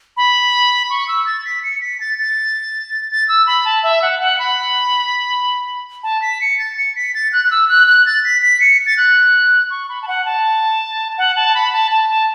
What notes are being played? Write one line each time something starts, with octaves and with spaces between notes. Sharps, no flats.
B5
C#6
E6
A6
B6
C#7
B6
A6
A6
A6
E6
B5
A5
E5
F#5
F#5
B5
A5
B6
C#7
A6
C#7
B6
A6
F#6
F#6
E6
F#6
F#6
A6
B6
B6
C#7
A6
F#6
C#6
B5
A5
F#5
A5
F#5
A5
B5
A5
A5
A5